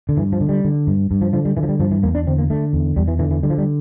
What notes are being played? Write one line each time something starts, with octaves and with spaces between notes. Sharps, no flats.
D3
G2 E3
F3
D3
G3
D3
G2
G2
F3
D3 F3
G3
D3 E3
F3
G3
G2 F3
E3
E2 A#3
D4
D3 C4
A#3
D3 A3
E2
E2 G3
E3
D3 E3
E3
D3 G3
F3
G3